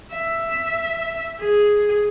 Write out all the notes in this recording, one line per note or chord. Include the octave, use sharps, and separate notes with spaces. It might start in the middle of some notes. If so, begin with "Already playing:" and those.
E5
G#4